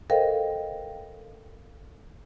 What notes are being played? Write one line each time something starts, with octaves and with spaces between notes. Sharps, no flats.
A4 A#4 C5 D#5 F5 G5